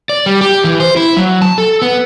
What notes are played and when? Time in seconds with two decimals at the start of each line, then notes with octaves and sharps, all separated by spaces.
0.09 D5
0.26 G3
0.41 G4
0.64 E3
0.80 C5
0.96 E4
1.17 F#3
1.42 A5
1.58 A4
1.82 B3